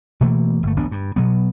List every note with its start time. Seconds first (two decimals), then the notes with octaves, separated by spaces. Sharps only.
0.21 B2 E3 A3 A#3
0.63 G1 A3
0.77 A1 D2 B3 D4
0.91 G2
1.16 B2 F#3 B3